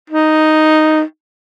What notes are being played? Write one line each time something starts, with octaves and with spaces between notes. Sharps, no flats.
D#4